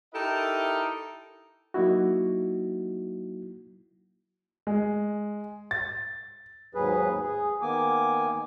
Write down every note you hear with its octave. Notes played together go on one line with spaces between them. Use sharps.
D#4 E4 G4 A4 A#4 D#5
F#3 A#3 D#4 E4 F#4
G#3
A6
D#2 G#2 F#3 G#4 B4
G#4
D#3 A#3 B3 G#5 D6